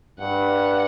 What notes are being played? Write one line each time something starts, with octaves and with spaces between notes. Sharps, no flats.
G2 F#5